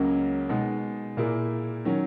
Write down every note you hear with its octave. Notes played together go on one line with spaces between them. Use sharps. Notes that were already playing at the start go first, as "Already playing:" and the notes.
Already playing: C#2 C#3 F#3 A#3 C#4
B2 G#3 D#4
A#2 A#3 E4 G#4
D#3 F#3 C#4